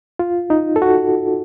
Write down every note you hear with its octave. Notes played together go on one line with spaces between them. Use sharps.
F4
D#4
A4
F#4